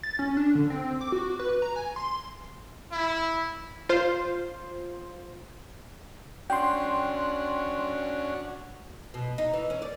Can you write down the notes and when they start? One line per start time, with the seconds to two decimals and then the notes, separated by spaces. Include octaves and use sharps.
0.03 A6
0.19 C#4
0.37 D4
0.55 D3
0.70 C4
1.01 D6
1.12 F#4
1.39 B4
1.62 A#5
1.76 G#5
1.96 C6
2.92 E4
3.89 F4 C5
6.50 C#4 D4 F#4 G5 C6
9.14 B2
9.38 D#4
9.53 E3
9.70 C#4
9.82 D5